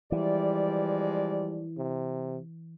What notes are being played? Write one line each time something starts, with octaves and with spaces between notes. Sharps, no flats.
E3 F3 G3 G#3 D5
C3